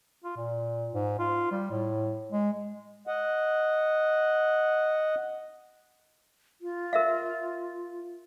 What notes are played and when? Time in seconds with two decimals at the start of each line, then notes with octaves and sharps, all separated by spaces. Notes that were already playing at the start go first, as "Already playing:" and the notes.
0.24 F4
0.36 A#2
0.94 G#2
1.19 F4
1.51 G3
1.70 A2
2.32 G#3
3.07 D#5 F#5
6.61 F4
6.93 A#4 E5 F5